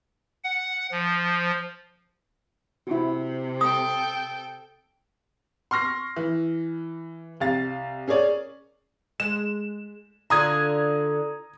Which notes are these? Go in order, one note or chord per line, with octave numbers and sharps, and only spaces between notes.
F#5
F3
C3 E4 F#4
A4 G5 D#6
C6 C#6 F6 A#6 C7
E3
C2 F5 A6
C#4 G#4 A#4 C#5 D5
G#3 E7
D3 F4 A#5 D#6 G#6